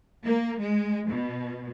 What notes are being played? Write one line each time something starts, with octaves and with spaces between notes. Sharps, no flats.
A#3
G#3
B2